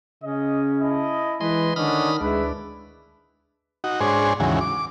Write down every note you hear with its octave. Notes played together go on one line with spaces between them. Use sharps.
C#3 C#4 D#5
E4 D#5 A5
E3 G#3 B4 D#5 C6
D3 D#3 C#4 D4 D#5 B5 D#6 F6
D2 G#3 D4 E4 B4
D#4 F#4
G#2 D4 G#4 C5 C#5
D#2 G#2 C#3 E3 F#3
D6